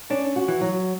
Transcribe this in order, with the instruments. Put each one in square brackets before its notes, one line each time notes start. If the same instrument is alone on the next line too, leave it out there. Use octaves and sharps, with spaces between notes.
[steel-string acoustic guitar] C#4 [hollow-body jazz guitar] D4
[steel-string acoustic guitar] F#4
[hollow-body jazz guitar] E3
[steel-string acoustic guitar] F#3